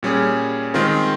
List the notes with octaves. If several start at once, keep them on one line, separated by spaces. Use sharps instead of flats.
A#2 G3 C#4 G#4
D#3 G#3 C4 F4 A#4